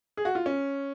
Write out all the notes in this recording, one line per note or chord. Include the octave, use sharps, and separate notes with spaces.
G#4
F#4
F4
C#4